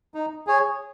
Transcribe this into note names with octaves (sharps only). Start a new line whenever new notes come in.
D#4
G#4 C#5